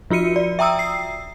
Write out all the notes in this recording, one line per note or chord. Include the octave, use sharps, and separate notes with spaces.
F3 F4 F#4 C#7 D#7
D5
E5 G5 A#5 D#6 E6
C7